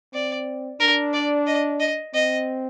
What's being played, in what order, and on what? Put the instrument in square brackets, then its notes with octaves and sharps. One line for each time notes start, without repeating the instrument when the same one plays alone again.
[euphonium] C4 [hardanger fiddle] D5
[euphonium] D4 [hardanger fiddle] A#4
[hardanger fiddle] D5
D#5
D#5
[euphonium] C4 [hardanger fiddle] D#5